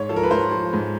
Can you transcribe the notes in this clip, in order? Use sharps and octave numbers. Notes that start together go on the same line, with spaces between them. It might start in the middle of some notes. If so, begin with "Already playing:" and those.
Already playing: G#2 C#5
F3 A4
A#4
B4
G#2 C5
F3
G#2